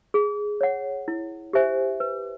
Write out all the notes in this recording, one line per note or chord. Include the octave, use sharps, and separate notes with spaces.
G#4
C#5 F#5
E4
G4 C5 E5 G#5
B4